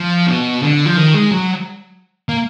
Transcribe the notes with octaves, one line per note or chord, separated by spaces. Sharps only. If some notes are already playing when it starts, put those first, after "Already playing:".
Already playing: F3
B2
D3
F3
D#3
G#3
F#3
A#3